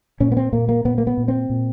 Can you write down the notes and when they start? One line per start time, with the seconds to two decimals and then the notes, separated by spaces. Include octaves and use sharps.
0.20 A#2 C#4
0.32 B3
0.37 C4
0.53 A#2 A#3
0.69 A#3
0.85 A#2 B3
0.98 A#3
1.07 B3
1.17 A#2
1.28 C4
1.50 A#2